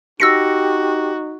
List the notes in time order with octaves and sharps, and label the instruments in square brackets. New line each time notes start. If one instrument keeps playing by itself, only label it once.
[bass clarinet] D#4 [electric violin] F#4 [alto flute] G4 [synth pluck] E6 A#6 C#7